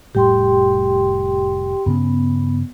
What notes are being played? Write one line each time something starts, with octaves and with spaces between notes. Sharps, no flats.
F1 A2 G3 G4 G5 C6
G2 C#3 B3 C#4